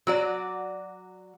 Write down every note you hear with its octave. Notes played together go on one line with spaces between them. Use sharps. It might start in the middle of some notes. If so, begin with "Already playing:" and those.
F#3 F#4 D5